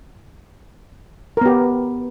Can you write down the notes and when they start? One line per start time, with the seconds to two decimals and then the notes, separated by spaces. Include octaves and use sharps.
1.37 A#4
1.41 B3
1.46 G4